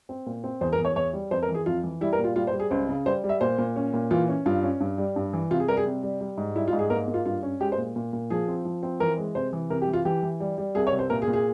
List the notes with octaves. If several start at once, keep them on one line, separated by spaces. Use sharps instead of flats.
C4
A#2
C4
E2 C5
A#4
E2
C#5
E2 C#5
G3
F2 C5
A#4
E3
G#4
F2 F4
E3
G3 E4
A#4
A#2
F4
G3 F4
C5
G3
G#4
C#2 C5
C#3
G3 C5
G3
E5
A#2 C5
A#2
C#4
A#2
E3 F4
C#4
G2 F4
C#4
G2
G3
G2
E3
C3 F4
G#4
G3 A#4
G#4
C3
G3
G3
G#2
G3 E4
F4
G#2
G#4
A#3 A#4
A#3
F4
G2 F4
C#4
G#3 G4
C5
A#2
A#2
A#2
F3 G#4
C4
F3
C4
E3 A#4
G#3
C3 C5
E3
C3 A#4
G4
E3
F4
E3 G4
E3
G3
G3
C2 G#4
C#5
C3
C5
A#2 A#4
G#4
A#2
G#4